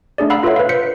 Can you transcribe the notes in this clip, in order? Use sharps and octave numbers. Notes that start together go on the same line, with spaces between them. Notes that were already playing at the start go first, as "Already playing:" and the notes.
A3 D4 G#4 D5
F5 F#5 A#5 B5 E6 C7
F4 A4 B4 C#5 E5 F#5
B4 F5
C5 B6 C#7